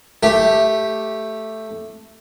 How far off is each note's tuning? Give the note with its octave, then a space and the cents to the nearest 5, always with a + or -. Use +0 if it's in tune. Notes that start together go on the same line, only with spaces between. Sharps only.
A3 +0 G4 +0